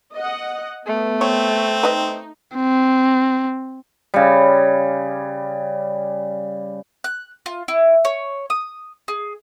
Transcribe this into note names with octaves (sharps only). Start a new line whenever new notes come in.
D#5 F#5
A3 B3
C4 C#5
D#4 B4 D#5
C4
C#3 G3
F#6
F4
E4
C#5
D#6
G#4